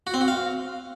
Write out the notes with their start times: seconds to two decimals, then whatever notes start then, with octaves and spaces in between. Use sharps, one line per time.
0.07 F#4
0.14 C4
0.21 F#4
0.28 F5